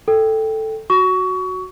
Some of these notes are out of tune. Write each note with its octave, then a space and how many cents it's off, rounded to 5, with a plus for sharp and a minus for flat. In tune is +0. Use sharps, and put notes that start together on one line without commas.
A4 +0 G5 +0
F#4 +0 C#6 +25